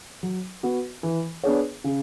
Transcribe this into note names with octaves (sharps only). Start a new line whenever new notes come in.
F#3
B3 F#4
E3
B3 D4 G#4 C#5
C#3